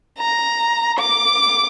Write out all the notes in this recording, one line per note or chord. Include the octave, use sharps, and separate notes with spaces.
A#5
D6